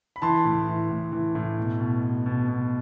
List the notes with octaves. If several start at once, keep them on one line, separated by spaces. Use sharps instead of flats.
B5
E3 A5 C6
A2
E3
A2
E3
A2
B2
B2
B2
B2
B2